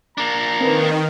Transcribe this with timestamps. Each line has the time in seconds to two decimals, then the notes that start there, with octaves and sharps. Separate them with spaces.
0.18 A#3 D4 A#5
0.61 D#3 C4 A#4 B4